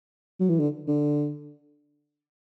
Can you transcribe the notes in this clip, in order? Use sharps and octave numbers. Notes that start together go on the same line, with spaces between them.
F#3
E3
D3
D3